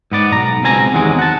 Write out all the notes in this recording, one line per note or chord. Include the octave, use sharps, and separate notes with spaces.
G#2 B3 D5
B1 A#5
C#2 B2 C4 G#5 A#5
E2 C3 D#3 F#3 G#3
F#5 A5